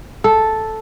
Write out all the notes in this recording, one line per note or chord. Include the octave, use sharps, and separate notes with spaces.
A4